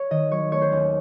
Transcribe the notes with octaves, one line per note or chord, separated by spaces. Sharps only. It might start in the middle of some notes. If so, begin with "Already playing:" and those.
Already playing: C#5
D#3 D#5
F#3 C#5
A3 C#5
C5
D#2 C#4